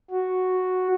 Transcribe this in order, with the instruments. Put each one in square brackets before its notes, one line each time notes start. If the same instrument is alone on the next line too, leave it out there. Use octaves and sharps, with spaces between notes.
[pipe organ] F#4